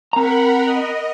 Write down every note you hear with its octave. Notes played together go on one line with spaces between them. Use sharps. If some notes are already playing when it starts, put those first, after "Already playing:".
C4 A#4 F#5 A#5 B5
D#5